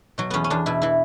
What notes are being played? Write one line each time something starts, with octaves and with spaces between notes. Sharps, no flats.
B2 F#3
E2 B3 C#4
C#4
E2 D4
B2 E4
E3 E4